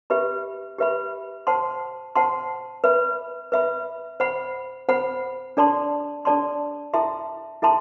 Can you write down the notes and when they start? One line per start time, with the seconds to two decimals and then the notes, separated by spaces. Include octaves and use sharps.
0.10 G4 B4 E5 B5
0.78 G4 B4 E5 B5
1.47 C5 F#5 A5 C6
2.16 C5 F#5 A5 C6
2.84 B4 E5 B5
3.52 B4 E5 B5
4.20 C5 F#5 B5
4.89 C5 F#5 B5
5.57 D4 A4 D5 A5 C6
6.25 D4 A4 D5 A5 C6
6.94 E4 A4 E5 A5 C6
7.62 E4 A4 E5 A5 C6